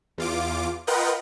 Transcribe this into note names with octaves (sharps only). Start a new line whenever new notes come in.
E2 F4 D6
F4 A#4 B4 D#5 F#5 G5